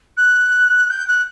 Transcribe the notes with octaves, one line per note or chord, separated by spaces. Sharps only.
F#6
G6
F#6